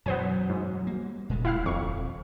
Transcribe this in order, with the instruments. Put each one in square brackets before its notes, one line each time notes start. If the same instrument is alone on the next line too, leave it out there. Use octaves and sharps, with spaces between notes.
[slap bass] F#2 B2 E3 [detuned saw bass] F#3 [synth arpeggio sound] B3 C5 G#5
[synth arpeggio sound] G#2
[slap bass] G3 A#3
[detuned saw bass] D#1 [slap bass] A#2 G#3 A3
[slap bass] F#1 [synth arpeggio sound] E4 F5 F6
[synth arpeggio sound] F2 C#6